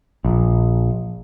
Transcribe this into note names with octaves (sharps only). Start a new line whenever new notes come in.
A#1